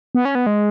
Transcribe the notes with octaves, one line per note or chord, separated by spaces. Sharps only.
B3
C#4
B3
G#3